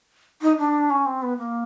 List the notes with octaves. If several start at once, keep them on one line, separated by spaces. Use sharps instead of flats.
D#4
D4
C#4
C4
B3
A#3